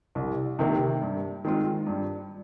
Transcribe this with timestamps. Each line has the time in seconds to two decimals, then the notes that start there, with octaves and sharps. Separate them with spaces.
0.15 C2
0.59 C3 D#3 A#3
1.01 G2
1.45 D#3 G#3 C4 F4
1.86 G2